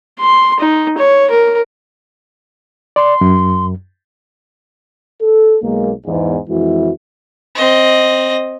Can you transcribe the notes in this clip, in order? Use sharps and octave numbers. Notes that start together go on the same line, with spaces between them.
C6
D#4
C#5
A#4
D5 C6
F#2
A4
B1 G#3 A#3
E2 G#2
F2 E3 G#3 E4 F#4
C4 D#5